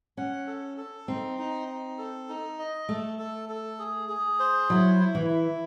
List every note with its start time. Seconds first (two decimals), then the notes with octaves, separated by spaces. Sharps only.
0.17 C#4 F#5
0.47 A4
0.78 A4
1.08 C4 D#4
1.38 D#4
1.68 D#4
1.98 A4
2.29 D#4
2.59 D#5
2.89 A3 A4
3.19 A4
3.49 A4
3.79 G#4
4.09 G#4
4.40 C5
4.69 F#3 E4
5.00 E4
5.15 E3
5.30 E4